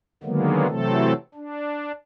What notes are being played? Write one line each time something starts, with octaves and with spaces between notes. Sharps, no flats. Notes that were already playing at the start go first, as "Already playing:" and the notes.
D3 D#3 F#3 G#3 A#3 B3
C3 E3 F#3 A3 C4 A4
D4